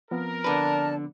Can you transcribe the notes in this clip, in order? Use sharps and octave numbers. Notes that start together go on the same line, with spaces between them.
F3 B3 C4 A#4
D3 B4 D5 A5